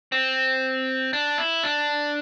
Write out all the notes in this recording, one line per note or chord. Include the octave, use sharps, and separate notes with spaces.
C4
D4
E4
D4